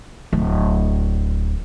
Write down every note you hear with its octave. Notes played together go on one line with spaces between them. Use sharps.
D1